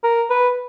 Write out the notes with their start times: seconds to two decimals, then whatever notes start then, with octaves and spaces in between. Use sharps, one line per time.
0.04 A#4
0.30 B4